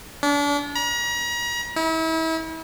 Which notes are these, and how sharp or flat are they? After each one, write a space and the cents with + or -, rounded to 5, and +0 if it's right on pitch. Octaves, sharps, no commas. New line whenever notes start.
D4 -35
A#5 +40
E4 -35